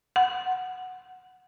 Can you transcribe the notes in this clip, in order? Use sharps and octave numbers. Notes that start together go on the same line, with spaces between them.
F#5